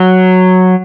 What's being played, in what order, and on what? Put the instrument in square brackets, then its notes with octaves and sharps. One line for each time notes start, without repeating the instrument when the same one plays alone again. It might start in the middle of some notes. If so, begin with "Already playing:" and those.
Already playing: [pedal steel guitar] F#3